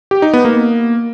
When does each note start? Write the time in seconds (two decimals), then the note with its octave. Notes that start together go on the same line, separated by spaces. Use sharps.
0.11 G4
0.22 D#4
0.33 B3
0.45 A#3